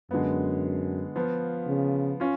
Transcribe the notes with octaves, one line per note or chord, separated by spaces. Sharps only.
F#2 D3 G#3 B3
F3 B3 F4
C#3
C#4 F4